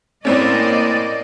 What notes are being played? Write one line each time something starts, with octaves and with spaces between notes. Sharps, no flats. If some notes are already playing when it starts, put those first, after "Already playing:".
A2 A#3 C4 C#4 D5 D#5